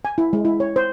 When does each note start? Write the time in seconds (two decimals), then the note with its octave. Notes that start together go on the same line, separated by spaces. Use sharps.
0.05 G#5
0.18 E4
0.33 G#3
0.45 E4
0.60 C#5
0.76 C5